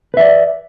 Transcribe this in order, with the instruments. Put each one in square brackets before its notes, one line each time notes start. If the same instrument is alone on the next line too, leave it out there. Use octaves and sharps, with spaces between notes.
[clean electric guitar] B4
E5
D5